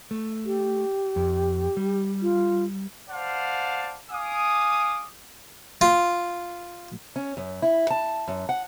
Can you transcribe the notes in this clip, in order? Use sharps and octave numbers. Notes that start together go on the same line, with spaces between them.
A3
G4
F2
G3
F4
C5 D5 F5 F#5 A5
F5 G#5 D6 D#6
F4
C#4
F#2
E4
A5
F#2
F#5